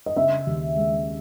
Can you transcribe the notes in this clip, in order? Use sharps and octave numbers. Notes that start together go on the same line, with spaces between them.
D#5
C#3 E5
D#2
G#3